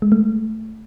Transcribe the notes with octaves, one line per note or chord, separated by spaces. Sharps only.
G#3
A3